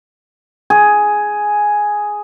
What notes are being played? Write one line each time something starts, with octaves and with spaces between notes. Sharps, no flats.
G#4